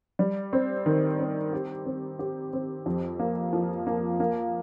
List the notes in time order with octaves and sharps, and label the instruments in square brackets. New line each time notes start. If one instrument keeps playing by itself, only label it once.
[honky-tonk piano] G3
C4
D#3
C4
G4
C4
G4
C4
F2
A#3
F3
A#3
A#3